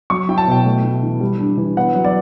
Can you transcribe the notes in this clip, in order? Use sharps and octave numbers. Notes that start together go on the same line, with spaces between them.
F#3 C#6
E4 G5
A5
B2 G5
A3
E4
E3
G3
D4
E3
B3 F#5
F#3
D5